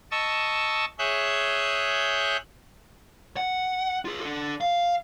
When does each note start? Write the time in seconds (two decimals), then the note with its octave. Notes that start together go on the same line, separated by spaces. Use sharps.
0.11 D#5 A5 C#6 E6
0.99 G#4 C#5 E5 F#6 G6
3.37 F#5
4.05 F4 G#4
4.21 D4 A4
4.61 F5